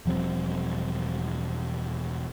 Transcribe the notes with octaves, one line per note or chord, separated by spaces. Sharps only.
E1 F3 G3 C4